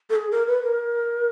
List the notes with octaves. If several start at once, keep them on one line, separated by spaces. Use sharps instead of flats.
A4
G#4
A#4
B4
A#4